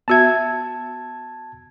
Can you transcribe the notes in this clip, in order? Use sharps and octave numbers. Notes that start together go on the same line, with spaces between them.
B3 F#4 E5 A5 G#6